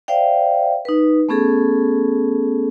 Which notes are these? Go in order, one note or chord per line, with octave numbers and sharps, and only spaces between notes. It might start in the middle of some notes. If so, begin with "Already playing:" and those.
C5 D5 E5 F5 G5
D#4 B4
A3 B3 C#4 G#4 A4